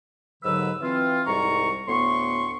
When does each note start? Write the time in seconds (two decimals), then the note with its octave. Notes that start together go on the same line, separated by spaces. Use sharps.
0.43 D#2 G#2 D3 F#3 B4 E6
0.82 E3 C4 F4
1.26 C2 G#2 G3 A#5 C#6
1.87 D2 A2 B3 C6 C#6